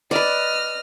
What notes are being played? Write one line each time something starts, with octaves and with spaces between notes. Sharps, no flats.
B4 D5 D#5 F6